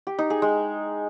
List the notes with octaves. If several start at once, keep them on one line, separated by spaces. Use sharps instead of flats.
G4
D#4
G#4
G#3